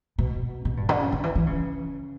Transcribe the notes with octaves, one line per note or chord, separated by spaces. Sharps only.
B2
B2
G2
D3
C#3
D3
E3
E3
C#3